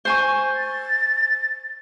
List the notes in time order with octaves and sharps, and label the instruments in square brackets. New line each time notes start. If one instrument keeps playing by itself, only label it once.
[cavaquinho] C5 G#5 C#6
[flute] A6